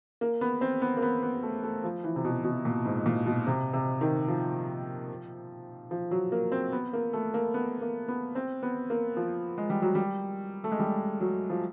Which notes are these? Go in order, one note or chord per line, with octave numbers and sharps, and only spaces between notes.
A#3
B3
C4
B3
A#3
B3
B3
A3
A3
F3
E3
C3
B2
B2
A#2
G#2
A#2
B2
C3
C3
D#3
F3
F3
F#3
A#3
C4
B3
A#3
A3
A#3
B3
A#3
B3
C4
B3
A#3
F3
G#3
G3
F#3
G3
A3
G#3
G3
F#3
F3